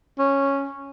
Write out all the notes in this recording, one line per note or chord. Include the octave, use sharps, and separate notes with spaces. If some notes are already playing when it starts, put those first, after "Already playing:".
C#4